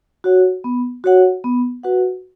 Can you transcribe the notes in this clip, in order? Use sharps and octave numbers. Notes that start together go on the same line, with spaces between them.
F#4 C#5 F#5
B3
F#4 C#5 F#5
B3
F#4 B4 F#5